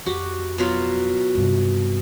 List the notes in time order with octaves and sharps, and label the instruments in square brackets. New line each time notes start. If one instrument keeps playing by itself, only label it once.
[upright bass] F2 [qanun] F#4 G4 F#5
[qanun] B2 F#3 F4
[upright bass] G2 C3